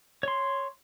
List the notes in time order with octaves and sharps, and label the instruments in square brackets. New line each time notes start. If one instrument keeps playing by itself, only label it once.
[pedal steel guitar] C#5 C6